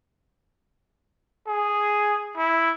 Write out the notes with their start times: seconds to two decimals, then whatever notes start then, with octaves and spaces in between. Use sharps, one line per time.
1.47 G#4
2.37 E4